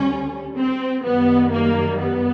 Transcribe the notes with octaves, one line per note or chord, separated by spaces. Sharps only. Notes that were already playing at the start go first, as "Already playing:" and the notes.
Already playing: D2 D3 G3 C#4
C4
F#2 D#3 G3 B3
A#3
B3